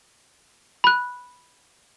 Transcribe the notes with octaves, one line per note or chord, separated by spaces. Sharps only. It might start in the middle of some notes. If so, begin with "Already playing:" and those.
B5 F#6